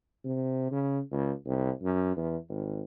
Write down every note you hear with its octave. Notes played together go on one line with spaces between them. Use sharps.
C3
C#3
C#2
C2
F#2
E2
G#1